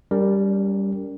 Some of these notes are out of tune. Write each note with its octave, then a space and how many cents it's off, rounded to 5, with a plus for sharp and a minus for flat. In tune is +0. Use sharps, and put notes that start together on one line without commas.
G3 +5 C#4 +40 A#4 -10